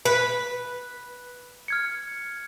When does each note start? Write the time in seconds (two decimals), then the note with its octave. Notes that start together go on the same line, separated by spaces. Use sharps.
0.05 B4
1.68 F6 G#6 C#7